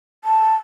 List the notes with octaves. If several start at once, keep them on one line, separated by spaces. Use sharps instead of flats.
A5